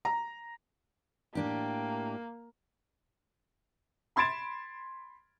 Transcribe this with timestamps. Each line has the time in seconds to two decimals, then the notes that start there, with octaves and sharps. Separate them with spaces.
0.05 A#5
1.35 A2 A#3 D4 G4
4.16 B5 C6 G#6 A6 D7 E7